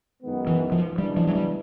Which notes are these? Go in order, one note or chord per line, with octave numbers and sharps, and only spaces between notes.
F#2 D#3 G#3 B3
E3
F3
C#3 E3 G3 G#3 B3 D4
F3
F#3
G3